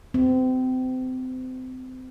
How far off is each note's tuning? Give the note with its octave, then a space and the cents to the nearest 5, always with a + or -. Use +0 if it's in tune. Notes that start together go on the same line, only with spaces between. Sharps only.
C4 -30